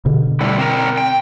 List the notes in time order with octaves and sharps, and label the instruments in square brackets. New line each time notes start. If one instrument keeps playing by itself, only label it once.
[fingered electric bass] B2 D3
[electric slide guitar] A2 G3 E4
C4 A#4
G5